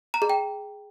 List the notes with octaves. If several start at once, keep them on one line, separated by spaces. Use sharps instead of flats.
A#5
G#4
G5